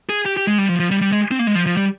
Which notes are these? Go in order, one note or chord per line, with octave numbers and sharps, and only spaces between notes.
G#4
G4
G4
G#3
G3
F3
F3
G3
G3
G#3
C4
A#3
G#3
F3
F3
G3